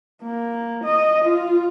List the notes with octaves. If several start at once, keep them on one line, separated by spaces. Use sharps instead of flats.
A#3
D#5
F4